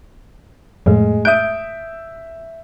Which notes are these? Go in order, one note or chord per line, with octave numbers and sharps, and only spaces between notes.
F2 A2 G#3 A3
E5 D#6 G6 D7